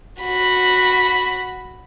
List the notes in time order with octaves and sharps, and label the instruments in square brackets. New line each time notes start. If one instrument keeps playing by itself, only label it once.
[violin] F#4 B5